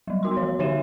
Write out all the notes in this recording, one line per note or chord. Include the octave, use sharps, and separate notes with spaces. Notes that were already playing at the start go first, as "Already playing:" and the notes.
F#3 G3
B3 F#4 C6
E3 F3 C#5
D3 D#4 C#5 E5 D#7 E7